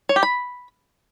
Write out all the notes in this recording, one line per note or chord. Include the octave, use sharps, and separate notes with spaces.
C#5
G4
B5